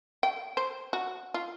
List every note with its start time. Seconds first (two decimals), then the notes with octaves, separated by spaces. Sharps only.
0.23 G5
0.57 C5
0.93 F#4
1.34 F4